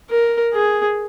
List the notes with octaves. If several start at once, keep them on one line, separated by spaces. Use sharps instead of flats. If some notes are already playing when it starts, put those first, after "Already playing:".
A#4
G#4